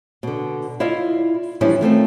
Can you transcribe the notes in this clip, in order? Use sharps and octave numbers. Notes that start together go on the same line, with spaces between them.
B2 D3
E4 F4 D5 D#5 F5
E3 F3 G3 C#4 D4 E4
D#3 A3 C4 F4